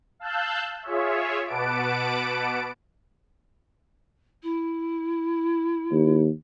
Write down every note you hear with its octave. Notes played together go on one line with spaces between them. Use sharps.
F5 A5 E6 F#6 G6
F4 G#4 C#5 E5
B2 B4 F#5 A5 D6 D7
E4
D#2